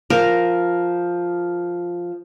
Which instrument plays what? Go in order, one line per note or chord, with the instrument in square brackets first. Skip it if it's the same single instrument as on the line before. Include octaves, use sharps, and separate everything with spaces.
[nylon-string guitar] F3 [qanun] A#4